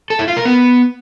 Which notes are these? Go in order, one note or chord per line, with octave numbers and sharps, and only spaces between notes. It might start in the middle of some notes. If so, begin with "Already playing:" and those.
A4
E4
F4
A#4
B3